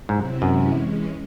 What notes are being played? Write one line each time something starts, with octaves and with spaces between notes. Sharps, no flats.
G#2 C3 F#3 C4 E4
F#2 C3 E3 G#3 C#4 E4
E3 G#3 C#4